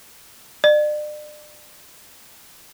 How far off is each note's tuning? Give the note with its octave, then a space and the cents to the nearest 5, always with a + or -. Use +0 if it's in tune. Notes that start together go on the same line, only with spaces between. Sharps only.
D5 +35